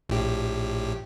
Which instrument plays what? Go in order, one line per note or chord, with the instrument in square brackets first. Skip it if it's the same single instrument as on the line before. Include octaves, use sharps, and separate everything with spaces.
[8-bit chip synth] A#1 A2 G4